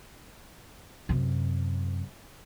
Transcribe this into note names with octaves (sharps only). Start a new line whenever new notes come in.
F#2 C3